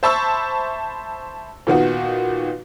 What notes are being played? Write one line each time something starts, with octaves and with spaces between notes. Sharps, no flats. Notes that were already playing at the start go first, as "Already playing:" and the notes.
C5 E5 A5 B5 C#6 E6
A#2 D#3 B3 F#4